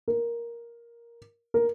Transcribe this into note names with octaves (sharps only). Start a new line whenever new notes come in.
A#4
A#4